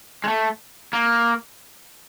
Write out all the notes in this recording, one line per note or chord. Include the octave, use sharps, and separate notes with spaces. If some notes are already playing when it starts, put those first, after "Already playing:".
G#3
A3
A#3